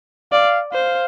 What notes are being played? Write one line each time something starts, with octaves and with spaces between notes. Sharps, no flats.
D5 F5
C5 F5